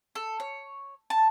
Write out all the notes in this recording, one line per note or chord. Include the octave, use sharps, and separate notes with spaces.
A4
C#5
A5